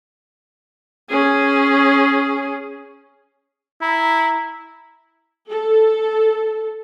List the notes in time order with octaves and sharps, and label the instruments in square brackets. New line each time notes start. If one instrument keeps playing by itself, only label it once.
[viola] C#4 G#4
[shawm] E4 [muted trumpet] A#5
[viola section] A4